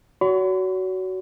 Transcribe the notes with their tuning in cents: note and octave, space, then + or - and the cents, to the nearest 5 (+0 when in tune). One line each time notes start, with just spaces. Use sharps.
F#4 +15 C#5 +40 B5 +45